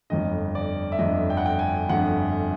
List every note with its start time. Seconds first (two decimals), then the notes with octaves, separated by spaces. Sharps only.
0.10 G1 F2 D3 D#5
0.55 D5
0.92 E5
0.99 G1 F2 D3 D#5
1.30 G5
1.37 F#5
1.46 G5
1.59 G#5
1.89 G1 F2 D3 F#5